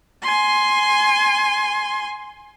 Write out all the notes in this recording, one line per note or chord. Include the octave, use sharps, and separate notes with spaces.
G#5 C6